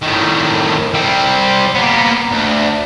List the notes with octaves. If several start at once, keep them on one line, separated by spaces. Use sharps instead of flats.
A2 D#3
G3 C4
A#3 B3
D2